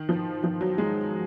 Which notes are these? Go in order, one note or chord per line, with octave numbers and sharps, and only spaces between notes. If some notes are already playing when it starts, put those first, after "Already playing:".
Already playing: D#3
F3
F3
F#3
G#3